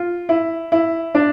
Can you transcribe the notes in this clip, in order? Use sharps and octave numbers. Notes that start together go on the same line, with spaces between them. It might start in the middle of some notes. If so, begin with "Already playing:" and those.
Already playing: F4
E4
E4
D4